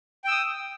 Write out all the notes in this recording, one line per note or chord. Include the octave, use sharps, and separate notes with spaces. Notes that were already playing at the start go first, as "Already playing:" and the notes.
G5 D#6 E6